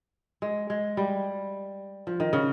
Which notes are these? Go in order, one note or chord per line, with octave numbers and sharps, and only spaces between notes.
G#3
G#3
G3
F3
D#3
C#3